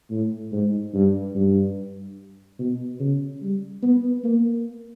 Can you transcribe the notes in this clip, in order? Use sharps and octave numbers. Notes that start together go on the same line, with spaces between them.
A2
G#2
G2
G2
B2
C#3
G3
B3
A#3